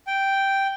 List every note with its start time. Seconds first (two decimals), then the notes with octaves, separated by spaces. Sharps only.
0.07 G5